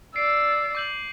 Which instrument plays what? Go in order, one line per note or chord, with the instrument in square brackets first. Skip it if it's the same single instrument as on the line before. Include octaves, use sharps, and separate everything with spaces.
[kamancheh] D5 E6 [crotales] C7 D7
[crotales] D6 G6 F#7